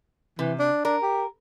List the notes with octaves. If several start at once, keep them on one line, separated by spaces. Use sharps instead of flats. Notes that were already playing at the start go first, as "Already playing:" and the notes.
C3 E3
D4
D4 A#4
G4